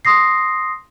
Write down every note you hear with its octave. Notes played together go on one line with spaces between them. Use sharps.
C6 D#6 A#6 C7